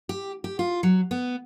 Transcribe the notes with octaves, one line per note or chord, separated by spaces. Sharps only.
G4
G4
F4
F#3
B3